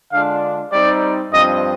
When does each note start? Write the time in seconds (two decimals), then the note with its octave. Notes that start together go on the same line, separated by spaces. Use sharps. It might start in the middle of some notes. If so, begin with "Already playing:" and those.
0.12 D3 G#3 D4 F4 F5
0.72 G3 C4 D#4 G4 D5
1.32 G2 F3 C4 D#5